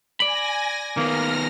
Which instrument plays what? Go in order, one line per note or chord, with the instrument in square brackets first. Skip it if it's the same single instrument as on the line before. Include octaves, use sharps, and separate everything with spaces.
[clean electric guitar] D5 B5 [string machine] G#5 A#6
[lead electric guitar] D#3 B3 [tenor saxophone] A#3 [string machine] F6 A#6